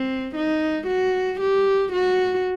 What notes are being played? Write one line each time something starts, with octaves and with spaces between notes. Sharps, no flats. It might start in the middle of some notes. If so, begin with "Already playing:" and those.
Already playing: C4
D#4
F#4
G4
F#4